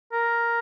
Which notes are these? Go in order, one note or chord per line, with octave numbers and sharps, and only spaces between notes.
A#4